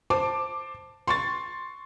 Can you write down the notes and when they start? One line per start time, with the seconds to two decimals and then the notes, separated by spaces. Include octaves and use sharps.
0.10 C5 A5 D6
1.07 C6 C#6 A6